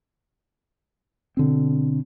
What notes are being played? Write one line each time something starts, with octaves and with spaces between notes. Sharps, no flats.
B2 D3 C4